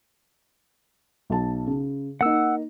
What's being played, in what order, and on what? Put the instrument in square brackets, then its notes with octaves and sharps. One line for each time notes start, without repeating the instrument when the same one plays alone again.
[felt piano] B1 A5
C#3
[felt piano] A#3 D#4 [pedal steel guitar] F#5 E6